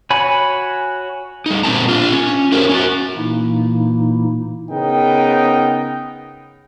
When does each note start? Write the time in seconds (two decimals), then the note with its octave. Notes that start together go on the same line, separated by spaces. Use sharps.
0.10 F#4 C#5 G#5 B5
1.46 G3 D#4
1.63 A#2 C4 C5 A5 A#5
1.88 D4 F4
2.14 C#4
2.52 E4 F#4 G4 A#4 C5 C#5
2.69 C#4 E4 F#4
3.15 A#2 E3 A#3 D#4 E4
4.71 C#3 B3 D#4 A#4 G5